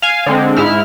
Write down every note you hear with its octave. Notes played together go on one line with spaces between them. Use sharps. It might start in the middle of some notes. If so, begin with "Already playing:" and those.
F5 G#5
D3 G#3 C4
G#2 E4 F6